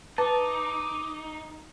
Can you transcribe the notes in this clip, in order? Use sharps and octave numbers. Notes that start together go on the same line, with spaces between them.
D#4 B4 A5 D6